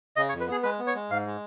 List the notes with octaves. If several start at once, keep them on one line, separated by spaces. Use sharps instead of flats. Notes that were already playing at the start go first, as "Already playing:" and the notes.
C#3 D#5
C#5
F2
B4
B3 G#4
G#3 B4
B3
C#5
G#3
G#2 F5
G#3